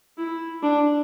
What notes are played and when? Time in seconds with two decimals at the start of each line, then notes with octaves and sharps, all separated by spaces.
0.18 E4
0.63 D4